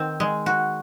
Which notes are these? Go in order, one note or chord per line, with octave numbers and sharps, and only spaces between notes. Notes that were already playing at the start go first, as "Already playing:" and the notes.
Already playing: D#3 C4
G#3
F#4